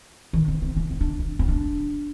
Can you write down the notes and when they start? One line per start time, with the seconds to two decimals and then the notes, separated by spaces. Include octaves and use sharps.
0.33 D#3
0.48 C4
0.62 C4
0.77 A#3
0.91 C4
1.01 D4
1.19 D4
1.39 C4
1.48 D4